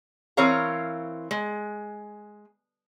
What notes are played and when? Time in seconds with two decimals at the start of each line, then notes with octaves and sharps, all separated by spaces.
0.37 E3 C4 A#4 C#5 F5 A#5
1.31 G#3